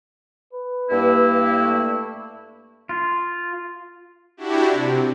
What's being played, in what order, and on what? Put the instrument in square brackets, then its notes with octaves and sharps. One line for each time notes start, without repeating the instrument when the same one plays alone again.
[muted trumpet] B4
[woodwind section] G2 A#3 E4
[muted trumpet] A3
[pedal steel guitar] F4
[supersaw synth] D4 E4 F#4 G4
C3